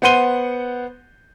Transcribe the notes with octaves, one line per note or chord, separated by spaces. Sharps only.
B3 C5 F#5 C6 D#7 G7